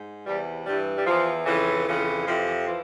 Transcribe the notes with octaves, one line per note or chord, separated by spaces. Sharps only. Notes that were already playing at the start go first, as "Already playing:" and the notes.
Already playing: G#2
E2 C3 E3 G3
G2 E3 G3
G3
E2 E3 F3
F2 C#3 E3
F2 C#3 E3
F2 C3 E3 F3
E3
E3 F3